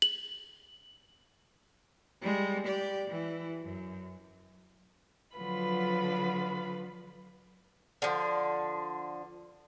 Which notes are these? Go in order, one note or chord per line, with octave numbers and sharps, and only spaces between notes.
F#7
G3 G#3
G4 D5
E3
F#2
D3 F3 F#3 F4 B4 B5
D3 F3